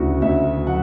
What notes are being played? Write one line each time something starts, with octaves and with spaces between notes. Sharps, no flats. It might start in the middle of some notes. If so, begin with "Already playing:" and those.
Already playing: D2 C#3 E4 F#4
D2 E5
F#3 F#5